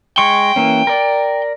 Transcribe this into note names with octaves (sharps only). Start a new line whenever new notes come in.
G#3 G5 C#6
E3 A#3 C#4
A#4 D5